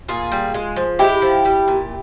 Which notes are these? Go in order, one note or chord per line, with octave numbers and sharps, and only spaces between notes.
A#2 F4 G#4
G3
G#3
F3
G#3 E4 G4
F3
G3
A#2